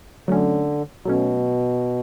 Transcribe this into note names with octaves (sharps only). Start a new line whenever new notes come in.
D3 F#3 A3 C#4
B2 F#3 A3 C#4